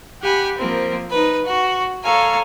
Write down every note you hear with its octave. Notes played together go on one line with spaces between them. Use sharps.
G4 F#5 G#5 B5
F3 A#3 C4 A#4
D#4 B4
F#4
A4 C#5 F5 G#5 A#5